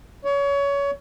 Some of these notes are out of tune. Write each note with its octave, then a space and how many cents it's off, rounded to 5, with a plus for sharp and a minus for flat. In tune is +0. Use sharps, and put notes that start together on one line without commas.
C#5 +25